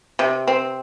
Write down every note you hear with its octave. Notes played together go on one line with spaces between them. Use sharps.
C3
C4